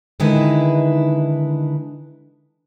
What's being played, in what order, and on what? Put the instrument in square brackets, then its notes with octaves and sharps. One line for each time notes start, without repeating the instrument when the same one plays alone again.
[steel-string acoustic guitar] D3 D#3 G#3 D#4 E4 B4